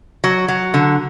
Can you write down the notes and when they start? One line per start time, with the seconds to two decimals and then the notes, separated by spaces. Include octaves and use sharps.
0.24 F#3
0.48 F#3
0.74 D3